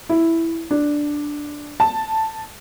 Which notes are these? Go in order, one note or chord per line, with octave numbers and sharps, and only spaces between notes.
E4
D4
A5